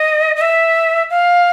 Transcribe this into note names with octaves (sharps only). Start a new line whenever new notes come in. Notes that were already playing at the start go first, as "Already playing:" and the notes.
Already playing: D#5
D#5
E5
F5